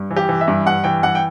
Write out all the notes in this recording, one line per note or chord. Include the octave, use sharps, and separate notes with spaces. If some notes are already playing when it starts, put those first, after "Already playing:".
Already playing: G2
E3
G4
E3
E5
G2
G2 F#5
E3 G5
G2 F#5
G5